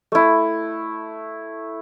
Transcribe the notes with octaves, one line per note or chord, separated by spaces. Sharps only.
A3 E4